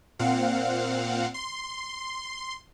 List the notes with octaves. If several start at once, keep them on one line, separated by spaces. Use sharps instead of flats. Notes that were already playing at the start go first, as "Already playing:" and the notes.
A#2 C4 F5 F#5
C6